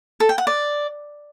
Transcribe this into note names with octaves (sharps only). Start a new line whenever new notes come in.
A4
G5
F#5
D5